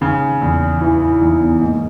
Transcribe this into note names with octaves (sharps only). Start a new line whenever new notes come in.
C#3 D#4
E2
E3 E4
E4
E2 D#4
B3
G#2 A#3